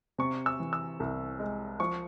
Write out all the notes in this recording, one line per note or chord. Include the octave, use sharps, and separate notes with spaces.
C3 C#6
E6
E3
E6
C2
G#3
F3 C#6